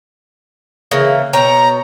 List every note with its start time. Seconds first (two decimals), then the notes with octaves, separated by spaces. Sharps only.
0.91 C#3 E3 A#3
1.33 B2 C#5 G5 A#5